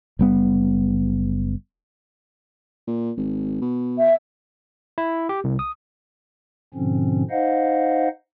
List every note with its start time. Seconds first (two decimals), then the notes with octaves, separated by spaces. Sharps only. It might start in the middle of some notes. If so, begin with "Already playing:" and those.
0.19 F#1 G3 B3
2.87 A#2
3.17 G#1
3.61 B2
3.99 E5
4.98 E4
5.29 G4
5.44 C2
5.59 D#6
6.74 G#2 B2 D3 F3 C4 C#4
7.30 D#4 C5 D#5 F5 F#5